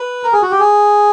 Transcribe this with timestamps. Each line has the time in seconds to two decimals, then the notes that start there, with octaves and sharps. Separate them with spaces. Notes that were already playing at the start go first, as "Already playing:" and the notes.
Already playing: B4
0.23 A#4
0.33 G#4
0.42 F#4
0.51 G4
0.59 G#4